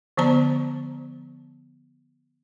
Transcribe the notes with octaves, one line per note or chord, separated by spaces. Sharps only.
D3 F3 B3 C5 A5 A#5